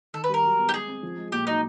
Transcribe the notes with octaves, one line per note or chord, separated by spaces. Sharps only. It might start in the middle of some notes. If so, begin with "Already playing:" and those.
D#3 A4
B4
G3 A#4
F#3
B3
G4
G#3 G#4
C4
F3
G#3
A#2 G4
F#3 D#4